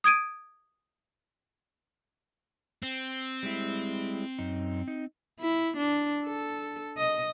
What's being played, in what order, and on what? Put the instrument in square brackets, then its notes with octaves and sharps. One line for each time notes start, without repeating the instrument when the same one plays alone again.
[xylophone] D#6 G#6 D7 D#7
[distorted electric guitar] C4
[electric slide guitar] G3 G#3 E4
F#2 D#4
D#4
[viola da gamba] E4
D4
A4
D#5